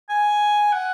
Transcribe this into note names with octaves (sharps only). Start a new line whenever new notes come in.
G#5
F#5